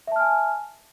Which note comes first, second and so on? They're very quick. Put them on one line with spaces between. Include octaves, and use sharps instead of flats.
E5 A5 F6 G#5